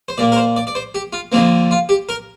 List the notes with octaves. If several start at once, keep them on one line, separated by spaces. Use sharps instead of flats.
C5
A#2 A#3 D5
A#4
C5
D5
D5
C5
G4
F4
F2 D3 F3 A#3 C4
F4
G4
A#4